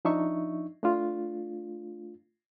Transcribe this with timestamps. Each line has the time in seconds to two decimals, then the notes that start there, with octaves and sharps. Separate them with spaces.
0.05 F3 D4 D#4 E5 C#6
0.83 A3 D4 F4